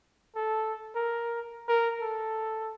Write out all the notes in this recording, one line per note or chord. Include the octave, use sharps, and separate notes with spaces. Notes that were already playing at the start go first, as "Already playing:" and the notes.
A4
A#4
A#4
A4